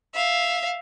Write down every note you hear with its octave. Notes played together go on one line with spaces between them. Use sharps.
E5 F5